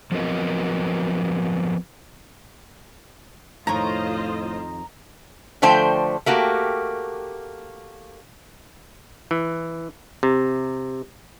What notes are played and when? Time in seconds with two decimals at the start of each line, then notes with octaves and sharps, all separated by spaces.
0.12 F3 F#3 B3 C4 A#4 D#5
3.67 F2 A2 D#3 F4 C5 C#5 D#5 A#5
5.62 D3 F3 A3 C5 G5
6.26 A3 A#3 F#4 G4
9.31 E3
10.23 C3